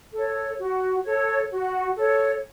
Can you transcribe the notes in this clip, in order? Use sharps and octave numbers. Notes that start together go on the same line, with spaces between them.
A4 C#5
F#4
A4 C#5
F#4
A4 C#5